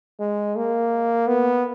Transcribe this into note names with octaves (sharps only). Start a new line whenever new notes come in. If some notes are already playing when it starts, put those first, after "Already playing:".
G#3
A#3
B3